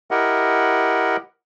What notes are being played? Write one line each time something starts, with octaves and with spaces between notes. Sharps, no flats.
E4 G4 A#4 D#5 F#5